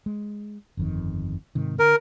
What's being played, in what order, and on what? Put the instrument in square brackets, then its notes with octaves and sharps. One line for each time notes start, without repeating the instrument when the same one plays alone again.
[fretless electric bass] G#3
G1 F2 D#3
G#2 C3 D#3
[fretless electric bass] D3 [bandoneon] A#4